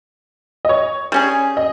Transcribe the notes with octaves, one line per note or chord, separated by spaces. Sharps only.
D#5
C#5
G3 C#4 G#4
D#5